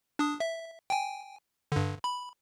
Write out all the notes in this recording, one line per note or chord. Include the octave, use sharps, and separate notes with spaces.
D4 D#6
E5
G5 G#5
G2 D3
B5